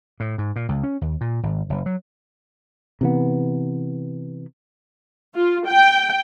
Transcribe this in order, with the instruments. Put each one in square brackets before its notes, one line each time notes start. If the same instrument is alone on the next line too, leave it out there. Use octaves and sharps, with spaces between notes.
[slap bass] A2
G#2
A#2
C#2
C#4
D#2
A#2
G#1
F#1
F#3
[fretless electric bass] C3 E3 B3
[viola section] F4
G5